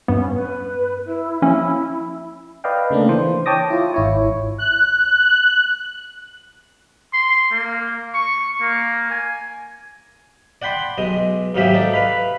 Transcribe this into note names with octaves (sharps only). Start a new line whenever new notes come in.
G2 B3 C#4
B4
E4
F3 A#3 C#4 E4
B4 D5 D#5 F5 G5
C#3 A3 A#3 D4
E3 C5
C#5 G5 A5 D6 D#6 A#6
E4 F4
G#1 E4 C#5
F#6
C6
A#3
C#6
A#3
G#5
D5 F#5 G5 B5 C6
B1 G#3 D#5
D#2 G#2 F#3 A#3 G4 E5
D#4 A4 D5
B4 F5 B5